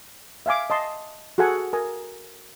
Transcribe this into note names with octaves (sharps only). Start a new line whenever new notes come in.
E5 F5 G#5 D6
D#5 A5 C6
F#4 G#4 A4 F#5 G#5
A#4 G#5 A#5 D#6